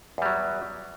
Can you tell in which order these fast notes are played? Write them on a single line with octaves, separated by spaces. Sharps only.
E2 G3 F#3